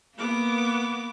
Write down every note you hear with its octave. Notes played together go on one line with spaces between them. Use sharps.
A#3 B3 D6